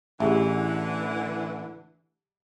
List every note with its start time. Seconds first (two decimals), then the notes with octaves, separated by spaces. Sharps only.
0.20 A1 D3 E3 G4 G#4 E5